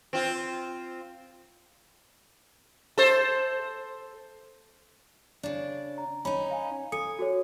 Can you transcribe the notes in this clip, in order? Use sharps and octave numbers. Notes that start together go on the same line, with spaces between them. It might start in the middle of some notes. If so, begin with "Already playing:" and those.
C4 F4
A4 C5
C#3 D4
A#5
C#4 D#4 B5
F5 G#5
A4 G#5 D#6 C#7
F#4 A4 C#5